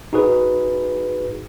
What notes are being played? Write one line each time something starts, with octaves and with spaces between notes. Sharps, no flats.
D#4 F#4 G#4 B4